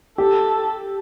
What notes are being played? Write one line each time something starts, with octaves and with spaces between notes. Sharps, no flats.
G4 A4